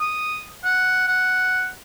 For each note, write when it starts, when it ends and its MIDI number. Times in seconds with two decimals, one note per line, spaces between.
0.01 0.46 87
0.64 1.06 78
1.08 1.69 78